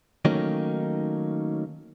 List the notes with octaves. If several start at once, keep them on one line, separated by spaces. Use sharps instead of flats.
D#3 F#3 A3 A#3 C#4 D#4